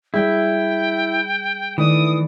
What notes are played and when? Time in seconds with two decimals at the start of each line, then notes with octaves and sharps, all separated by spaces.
0.14 G3 E4 G#4 G5
1.78 D#3 E3 A3 D5 D#6